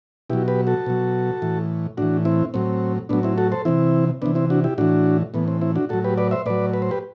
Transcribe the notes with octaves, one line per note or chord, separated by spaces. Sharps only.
B2 F#3 E4 G4
G4 B4
F#4 A4
B2 F#3
A2 E3
A2 E3 D4 F#4
C4 E4
A2 F#3 C4
A2 F#3 B3 D4
C4 E4
F#4 A4
A4 C5
C3 E3 C4 E4
C3 E3 B3 D4
C4 E4
D4 F#4
E4 G4
A2 E3 D4 F#4
A2 E3 B3
C4
C4 E4
D4 F#4
A2 F#3 F#4 A4
G4 B4
B4 D5
C5 E5
A2 F#3 B4 D5
B4
C5
G4 B4